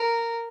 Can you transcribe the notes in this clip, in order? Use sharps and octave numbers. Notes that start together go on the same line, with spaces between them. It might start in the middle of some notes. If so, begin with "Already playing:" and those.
Already playing: A#4